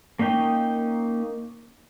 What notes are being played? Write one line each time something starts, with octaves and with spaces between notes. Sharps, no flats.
A#3 C#4 D#4 G5